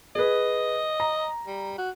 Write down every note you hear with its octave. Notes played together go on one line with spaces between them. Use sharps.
G#4 B4 D#5
A#5
G3
F#4